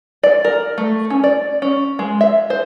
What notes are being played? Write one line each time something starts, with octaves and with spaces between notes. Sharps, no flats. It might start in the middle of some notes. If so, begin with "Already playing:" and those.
D5
A#4
A3
C#4
D5
C#4
G#3
E5
C5